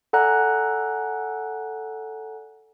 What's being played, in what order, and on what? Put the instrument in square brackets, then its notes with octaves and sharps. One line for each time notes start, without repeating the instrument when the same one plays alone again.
[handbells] A4 D5 F#5 G#5 A#5 F#6